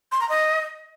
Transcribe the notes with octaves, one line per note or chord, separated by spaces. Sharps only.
C6
A#5
D#5